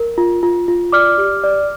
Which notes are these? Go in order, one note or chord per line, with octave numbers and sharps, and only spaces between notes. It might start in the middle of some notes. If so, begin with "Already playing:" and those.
Already playing: A#4
F4
F4
F4
D5 D6 F6
G4
D5